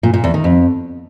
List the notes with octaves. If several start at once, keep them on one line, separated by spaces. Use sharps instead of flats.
A#2
A#2
E2
D#3
F2